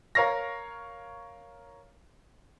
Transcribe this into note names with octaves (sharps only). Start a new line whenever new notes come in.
A#4 C#5 F5 C#6 A#6